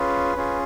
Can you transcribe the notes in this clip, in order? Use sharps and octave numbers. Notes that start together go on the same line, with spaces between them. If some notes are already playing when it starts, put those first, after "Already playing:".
Already playing: C#4 F4 G#4 B4
C#4 F4 G#4